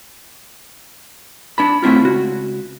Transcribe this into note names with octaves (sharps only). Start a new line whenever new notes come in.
D4 A5 B5
A2 A3 C4 E4 F4
C#2 F#4